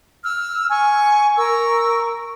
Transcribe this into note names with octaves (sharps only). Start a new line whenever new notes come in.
E6 F6
G#5 C#6
A#4 C#6 E6